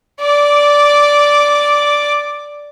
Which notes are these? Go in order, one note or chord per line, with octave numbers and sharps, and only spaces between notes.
D5 D6